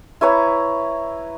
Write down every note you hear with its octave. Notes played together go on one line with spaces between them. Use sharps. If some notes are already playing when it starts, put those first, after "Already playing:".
E4 B4 C#5 A#5